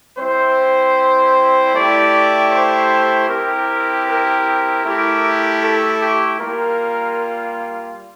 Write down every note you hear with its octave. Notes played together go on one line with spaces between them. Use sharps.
G3 C4 E4 C5
A3 E4 G4 D5
C5
C4 E4 G4 A#4
A#4
A3 E4 G4
A4
G4
G3 A#3 F4 A#4